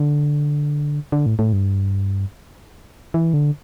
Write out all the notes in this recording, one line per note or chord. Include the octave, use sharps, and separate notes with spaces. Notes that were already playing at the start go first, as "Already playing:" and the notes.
Already playing: D3
D3
A2
A2
G2
E3
D3